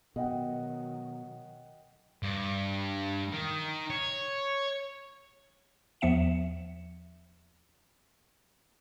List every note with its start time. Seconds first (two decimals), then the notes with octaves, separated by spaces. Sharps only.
0.16 B2 D#3 F#3 D#5 F#5 G5
2.23 G2
3.32 D#3
3.90 C#5
6.01 E2 F3 B3 E5 C#7 E7